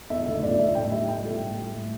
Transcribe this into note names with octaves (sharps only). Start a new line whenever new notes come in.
E2 E5
D3 A3 E5
E2 D5
D3 A3 E5
A2 G5
G3 E5
A2 G5
G3 A4
A2
G3
A2